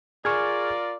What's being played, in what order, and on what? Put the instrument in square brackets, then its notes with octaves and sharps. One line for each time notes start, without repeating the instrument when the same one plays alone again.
[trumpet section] F4 A#4 D5 [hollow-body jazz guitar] G#4 [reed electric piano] C#6 F6 G#6